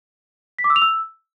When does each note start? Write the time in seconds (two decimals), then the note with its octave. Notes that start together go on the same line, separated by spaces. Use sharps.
0.59 B6
0.64 D6
0.70 E6
0.76 F7
0.82 E6